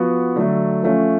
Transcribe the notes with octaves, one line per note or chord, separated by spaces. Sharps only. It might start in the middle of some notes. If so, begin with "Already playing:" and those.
Already playing: F3 B3 F#4
D3 F#3 A3
F3 A3 C#4